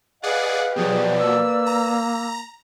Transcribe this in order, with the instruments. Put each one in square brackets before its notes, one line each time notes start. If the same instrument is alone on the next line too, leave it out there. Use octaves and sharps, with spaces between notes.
[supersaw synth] G#4 D5 [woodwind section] B4 D#5 F5 [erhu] F#5
[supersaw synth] B2 F3 F#3 [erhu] G4 [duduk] G#4 [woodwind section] B4 D5
[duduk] A#3 [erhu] E6
[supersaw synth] A#5